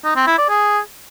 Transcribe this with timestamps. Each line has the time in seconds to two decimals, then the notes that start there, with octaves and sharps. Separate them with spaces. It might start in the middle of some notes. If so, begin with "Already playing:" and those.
0.04 D#4
0.16 C4
0.27 E4
0.38 D5
0.49 G#4